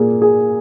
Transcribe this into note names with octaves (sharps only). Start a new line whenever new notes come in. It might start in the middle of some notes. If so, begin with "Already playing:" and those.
Already playing: A#2 A#3 G#4
G#4